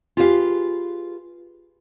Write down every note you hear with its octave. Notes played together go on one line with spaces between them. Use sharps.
F4 G4 G#4 B4 D#5 F5